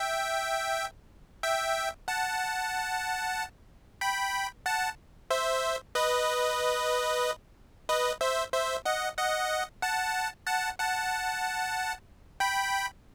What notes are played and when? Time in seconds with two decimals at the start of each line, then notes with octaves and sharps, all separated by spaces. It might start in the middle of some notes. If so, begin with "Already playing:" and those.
Already playing: E5 G5
1.43 E5 G5
2.08 F#5 A5
4.01 G5 B5
4.66 F#5 A5
5.31 C5 E5
5.95 B4 D#5
7.89 B4 D#5
8.21 C5 E5
8.53 C5 E5
8.85 D#5 F#5
9.18 D#5 F#5
9.82 F#5 A5
10.47 F#5 A5
10.79 F#5 A5
12.40 G5 B5